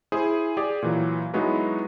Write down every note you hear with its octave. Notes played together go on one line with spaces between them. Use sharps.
E4 G#4 C5
G4 G#4 D5
A#2 E3 F#3
F#3 G#3 B3 D#4 E4 F#4